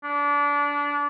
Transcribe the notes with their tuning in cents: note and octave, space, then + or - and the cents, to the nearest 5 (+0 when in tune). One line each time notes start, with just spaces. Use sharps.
D4 -25